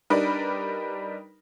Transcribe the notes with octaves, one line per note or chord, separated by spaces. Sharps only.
G3 D4 D#4 A#4 B4 D5